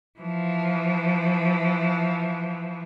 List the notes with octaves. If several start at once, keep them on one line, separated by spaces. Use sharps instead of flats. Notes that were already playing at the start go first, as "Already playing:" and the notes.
E3 F3